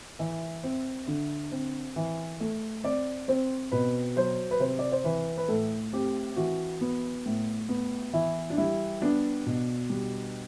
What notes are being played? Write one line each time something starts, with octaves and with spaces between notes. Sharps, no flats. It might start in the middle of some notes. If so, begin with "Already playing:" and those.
E3 E5
C4
D3
C4
E3
A3
C4 D5
C4 C5
B2 B4
F#3 C5
B4
C3 C5
D5
C5
E3 B4
B4
A2 A4
C4 G4
E3 F#4
B3
A2
B3
E3 E4
D4
G3 E4
B3 D4
B2
G3